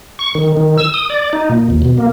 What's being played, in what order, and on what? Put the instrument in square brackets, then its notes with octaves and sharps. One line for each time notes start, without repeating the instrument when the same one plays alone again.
[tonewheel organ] C#6
D#3
D#3
E6
D#6
D5
D#4
A#2
D#2
B2
A#3